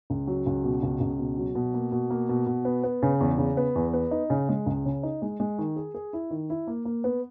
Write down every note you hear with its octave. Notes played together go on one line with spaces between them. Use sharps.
C#2
F#3
C#2
B2
C#2
C#2
B2
F#3
B2
A#3
B2
A#3
B2
B2
B3
B3
C#3
E2
C#3
B3
E2
B3
D#4
C#3
G#3
C#2
C#3
D#4
G#3
G#3
D#3
G#4
G#4
E4
D#3
E4
A#3
A#3
B3